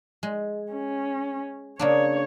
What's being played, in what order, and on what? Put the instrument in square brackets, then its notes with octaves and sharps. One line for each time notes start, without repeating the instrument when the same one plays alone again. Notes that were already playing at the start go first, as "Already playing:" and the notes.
[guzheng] G#3
[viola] C#4
[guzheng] C#3 A#3 D4 [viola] C#5